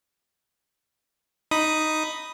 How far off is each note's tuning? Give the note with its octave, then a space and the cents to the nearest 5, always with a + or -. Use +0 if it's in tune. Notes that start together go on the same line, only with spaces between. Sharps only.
D#4 +0 B5 +0 D#6 +0